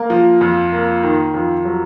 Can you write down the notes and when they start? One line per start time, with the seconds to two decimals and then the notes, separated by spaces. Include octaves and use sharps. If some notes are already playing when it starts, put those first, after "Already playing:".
Already playing: A#3
0.10 F3
0.41 F2
0.72 A#3
1.03 D#3
1.34 F2
1.65 F#3